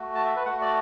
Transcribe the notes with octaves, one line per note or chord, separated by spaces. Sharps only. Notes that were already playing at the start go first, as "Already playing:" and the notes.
Already playing: A3 F#4
A5
E5
B4
A3 F#4 F#5
D5